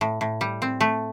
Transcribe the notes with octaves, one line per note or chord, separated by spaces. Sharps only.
A2
A2
G3
C4
A3